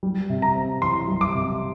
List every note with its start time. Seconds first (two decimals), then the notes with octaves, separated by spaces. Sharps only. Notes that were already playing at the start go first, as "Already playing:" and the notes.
0.03 G3
0.30 C3
0.42 A#5
0.55 C4
0.82 E3 C6
1.08 G3
1.21 D6
1.34 C3